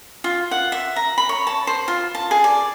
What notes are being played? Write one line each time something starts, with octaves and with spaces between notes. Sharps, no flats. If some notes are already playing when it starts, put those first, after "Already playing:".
F4
F#5
E5
A#5
B5
C#5
A5
C5
F4
A5
G#4
D5